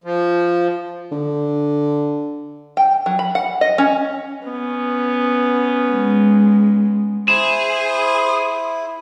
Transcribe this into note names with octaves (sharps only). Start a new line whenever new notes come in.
F3
D3
G5
F#3
B5
F#5
D#5
C#4
B3 C#4
G#3
E4 G#4 C5 E7